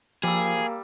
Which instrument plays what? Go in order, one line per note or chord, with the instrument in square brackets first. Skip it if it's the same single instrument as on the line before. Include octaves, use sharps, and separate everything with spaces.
[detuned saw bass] F3 [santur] G3 E6 [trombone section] A#3 [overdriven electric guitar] G#4